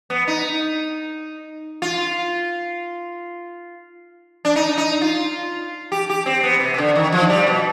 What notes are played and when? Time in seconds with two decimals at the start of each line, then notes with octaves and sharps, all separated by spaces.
0.10 B3
0.27 D#4
1.82 F4
4.45 D4
4.56 D#4
4.78 D#4
5.02 F4
5.92 G4
6.10 G4
6.26 C4
6.43 B3
6.61 C3
6.74 C3
6.78 D3
6.95 D#3
7.12 F3
7.29 G3
7.47 B2